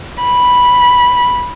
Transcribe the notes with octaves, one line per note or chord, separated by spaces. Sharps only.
B5